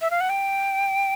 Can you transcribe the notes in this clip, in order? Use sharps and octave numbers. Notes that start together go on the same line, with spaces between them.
E5
F5
F#5
G5